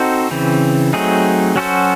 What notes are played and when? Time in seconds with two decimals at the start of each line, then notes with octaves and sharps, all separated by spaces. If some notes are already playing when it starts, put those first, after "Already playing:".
Already playing: C4 D#4 F#4 A4 C5
0.31 C#3 E3 C4
0.93 F#3 A3 C4 D#4 G#4
1.56 F#3 C#4 F#4 A4 C5